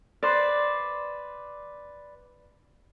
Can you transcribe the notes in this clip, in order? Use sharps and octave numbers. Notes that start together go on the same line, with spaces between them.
B4 C5 D5